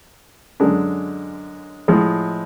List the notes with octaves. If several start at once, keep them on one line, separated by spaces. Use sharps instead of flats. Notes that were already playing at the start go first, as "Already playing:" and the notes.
F#2 D3 G#3 D4
A2 F3 G#3